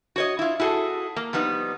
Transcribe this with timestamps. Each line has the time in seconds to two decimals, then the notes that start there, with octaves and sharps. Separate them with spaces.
0.16 F#4 C#5 D#5
0.39 E4 F4
0.60 E4 F#4 G#4 A4
1.16 A#3
1.33 F3 G3 B3 D#4